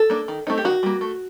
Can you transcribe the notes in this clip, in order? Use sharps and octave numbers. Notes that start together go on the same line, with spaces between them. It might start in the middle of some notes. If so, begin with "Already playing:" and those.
Already playing: A4
A#3 D4
D#3
A3 C4 D#4
G4
D#3 F#4
G3 A#3
A3